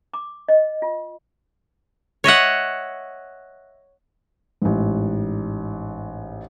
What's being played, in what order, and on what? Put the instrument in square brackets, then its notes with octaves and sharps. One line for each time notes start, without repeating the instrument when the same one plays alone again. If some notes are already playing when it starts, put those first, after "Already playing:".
[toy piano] D6
D#5
F4
[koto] C#5 D#5 E5 F#5
[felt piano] A1 G#2